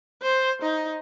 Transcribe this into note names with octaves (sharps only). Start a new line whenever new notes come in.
C5
D#4